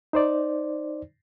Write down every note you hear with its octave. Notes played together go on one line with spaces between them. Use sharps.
D#4 C5 D5